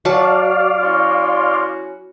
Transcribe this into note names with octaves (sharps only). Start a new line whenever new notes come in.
F#3 F#4 D5 F5 A5
C#4 E4 F#4 C6